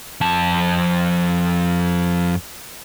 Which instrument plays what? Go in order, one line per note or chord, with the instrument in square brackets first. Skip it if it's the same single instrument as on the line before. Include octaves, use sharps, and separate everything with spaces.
[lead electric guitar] F2 A5